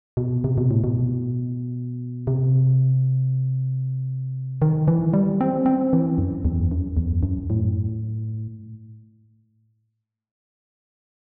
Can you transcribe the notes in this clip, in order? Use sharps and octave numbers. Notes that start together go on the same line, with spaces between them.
B2
C3
B2
A2
B2
C3
D#3
E3
G3
C4
C4
E3
F#2
E2
F#2
E2
F#2
A2